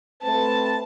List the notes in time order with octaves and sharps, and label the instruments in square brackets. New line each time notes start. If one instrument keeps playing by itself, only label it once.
[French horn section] A3 C4 B4 [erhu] A5